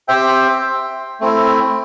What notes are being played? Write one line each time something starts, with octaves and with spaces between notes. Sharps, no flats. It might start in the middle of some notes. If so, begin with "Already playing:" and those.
C4 G4 C5 E5 G5
A3 C4 E4